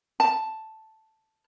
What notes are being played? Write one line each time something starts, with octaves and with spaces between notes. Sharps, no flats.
A5